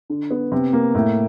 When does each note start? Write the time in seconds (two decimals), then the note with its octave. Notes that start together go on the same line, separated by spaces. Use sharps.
0.10 D3
0.31 B3
0.52 C3
0.73 A#3
0.95 A2